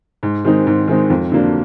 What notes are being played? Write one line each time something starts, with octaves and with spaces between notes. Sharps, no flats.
G#2
D#3 G#3 C4 D#4
G#2
D#3 G#3 C4 D#4
F2
D3 F#3 A#3 D4